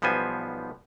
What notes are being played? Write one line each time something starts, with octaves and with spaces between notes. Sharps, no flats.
B1 F3 G3 B3 C5 G#5